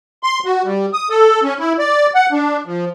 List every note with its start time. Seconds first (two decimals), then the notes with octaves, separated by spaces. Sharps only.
0.23 C6
0.45 F#4
0.65 G3
0.93 D#6
1.10 A4
1.43 C#4
1.59 E4
1.79 D5
2.15 F#5
2.32 D4
2.66 F3